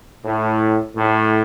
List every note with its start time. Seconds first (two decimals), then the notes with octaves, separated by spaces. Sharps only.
0.24 A2
0.94 A2